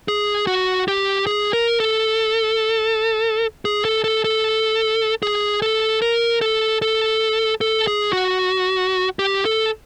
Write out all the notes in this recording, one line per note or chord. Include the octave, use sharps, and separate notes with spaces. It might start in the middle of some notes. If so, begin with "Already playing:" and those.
G#4
F#4
G4
G#4
A#4
A4
G#4
A4
A4
A4
G#4
A4
A#4
A4
A4
A4
G#4
F#4
G4
A4